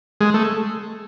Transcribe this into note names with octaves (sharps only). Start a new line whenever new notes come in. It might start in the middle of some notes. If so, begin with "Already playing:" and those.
G#3
A3